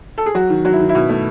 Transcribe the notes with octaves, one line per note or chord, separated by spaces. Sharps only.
A4
G#4
F#3 F#4
D#3
F#3 F#4
E4
D#3
E4
B2
A3